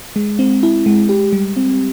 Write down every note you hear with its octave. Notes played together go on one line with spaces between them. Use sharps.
G#3
C4
E4
G#3
G4
G3
C4